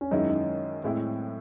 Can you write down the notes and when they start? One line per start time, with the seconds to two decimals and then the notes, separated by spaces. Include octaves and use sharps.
0.01 C#4
0.11 F#2 D#3 G#3 C#4 D#4 E4
0.29 D#4
0.84 A2 G#3 C4 E4